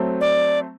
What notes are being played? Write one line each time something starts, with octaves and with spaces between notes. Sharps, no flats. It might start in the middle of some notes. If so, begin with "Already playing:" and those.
Already playing: F#3 A3 C4
D5